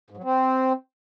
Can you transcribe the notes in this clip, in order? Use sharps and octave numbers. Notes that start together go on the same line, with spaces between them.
G#2
F#3
C4